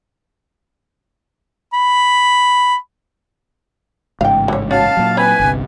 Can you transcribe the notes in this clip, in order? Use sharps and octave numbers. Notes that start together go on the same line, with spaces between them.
B5
A1 G#2 C#3 F5 G5
D3 C#5
C#4 F#4 F5 A5
A#2 F#3
C4 B4 G#5 A#5 B5
G1 C2 C3